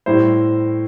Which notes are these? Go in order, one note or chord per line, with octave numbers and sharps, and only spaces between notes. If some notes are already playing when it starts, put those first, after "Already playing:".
A2 G3 E4 C5